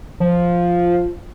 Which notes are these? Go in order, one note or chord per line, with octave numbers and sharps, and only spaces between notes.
F3